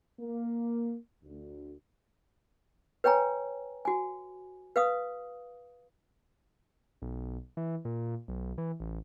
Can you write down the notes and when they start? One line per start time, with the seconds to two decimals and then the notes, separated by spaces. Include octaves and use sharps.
0.20 A#3
1.24 D2
3.04 B4 C#5 G5 G#5 A#5
3.85 F#4 G#5
4.76 B4 F5 D#6
7.02 B1
7.57 E3
7.85 A#2
8.28 B1
8.58 E3
8.80 A1